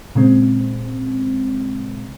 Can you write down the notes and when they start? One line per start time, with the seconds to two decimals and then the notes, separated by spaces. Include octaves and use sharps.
0.15 A#2 C#3 G#3 C4